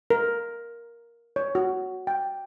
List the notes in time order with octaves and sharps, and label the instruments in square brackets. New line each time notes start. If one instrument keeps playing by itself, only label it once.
[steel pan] A#4
C#5
F#4
G5